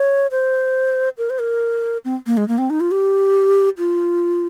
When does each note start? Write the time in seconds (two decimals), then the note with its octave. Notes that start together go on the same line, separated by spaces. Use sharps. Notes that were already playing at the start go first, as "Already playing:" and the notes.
Already playing: C#5
0.31 C5
1.18 A#4
1.30 C5
1.39 A#4
2.05 C4
2.27 A#3
2.37 G#3
2.48 A#3
2.58 C4
2.70 D#4
2.80 F4
2.91 G4
3.78 F4